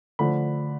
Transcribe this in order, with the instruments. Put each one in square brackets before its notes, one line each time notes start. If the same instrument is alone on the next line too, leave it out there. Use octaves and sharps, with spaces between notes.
[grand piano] D3 F3 A3 B5